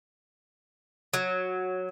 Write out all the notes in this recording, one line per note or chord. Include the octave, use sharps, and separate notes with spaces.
F#3